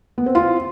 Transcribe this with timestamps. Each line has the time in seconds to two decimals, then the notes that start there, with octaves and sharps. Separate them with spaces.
0.18 B3
0.26 C4
0.35 F4